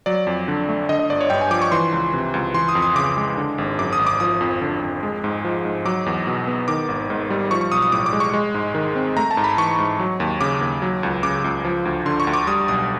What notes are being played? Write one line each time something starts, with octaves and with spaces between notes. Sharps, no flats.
F#3 D5
F2
D3
A3
D3 D#5
D#5
G1 D5
C#5
G2 G5
G#5
F3 D6
C#6
E3 C6
C#2
C3
C#2
E3 C6
D#6
F2
D#6
C#3 D6
G#3
D3
G#1
F#2 D6
D#6
G#1
D6
F3 D#6
F2
D3
F2
G#3
G#2
F3
G#2
F#3 D6
E2
B2
B3
D#3 D6
G#1
G#2
G3
F3 C#6
C#6
B1 D#6
D#6
A2 D6
D6
G#3
C#6
G#3
G#2
D#3
C4
A3 A#5
A5
G#2
B5
E3 C#6
G#2
F#3
D#2
C#3 D6
D#2
F#3
C#2
C#3 D6
C#2
F3
D2
D3 C6
C#6
D2
D6
G3 D#6
B1 D#6